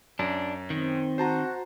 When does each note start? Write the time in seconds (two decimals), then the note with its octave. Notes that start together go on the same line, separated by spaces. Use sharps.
0.19 F#2 D4
0.70 D#3 C4
1.18 F#4 C5 A5 A#5